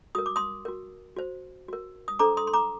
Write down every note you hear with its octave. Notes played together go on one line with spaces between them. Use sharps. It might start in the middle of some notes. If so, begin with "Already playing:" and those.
F#4 A#4 D#6
D6
C6 D#6
F#4 A#4
F#4 C5
F#4 A#4
D#6
D4 A4 C5 A#5 D6
C6 D#6
C6
A#5 D6